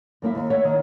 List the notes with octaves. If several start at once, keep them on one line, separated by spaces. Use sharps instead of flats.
F#2 A#3 E4 E5
D#2
C#5 E5 F#5
D#3